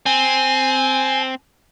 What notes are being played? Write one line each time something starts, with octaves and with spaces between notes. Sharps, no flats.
C4 G#5